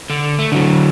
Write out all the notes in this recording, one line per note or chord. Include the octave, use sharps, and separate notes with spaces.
D3
A3
D3 F#3